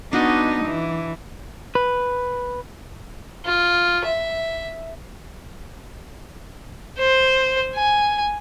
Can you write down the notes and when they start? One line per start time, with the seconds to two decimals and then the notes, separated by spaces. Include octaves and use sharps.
0.13 B3 D4 D#4 F#4 D#5
0.65 E3
1.75 B4
3.45 F4
4.04 E5
6.98 C5
7.75 G#5